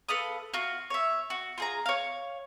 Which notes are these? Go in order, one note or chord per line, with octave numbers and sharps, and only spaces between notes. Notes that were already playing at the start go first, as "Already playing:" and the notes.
A4 B4 F5 D#6
F4 F#4
C#5 E5
F#4
F4 G#4 A#5
C#5 F5